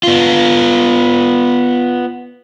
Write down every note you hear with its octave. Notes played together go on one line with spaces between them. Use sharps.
B3 F4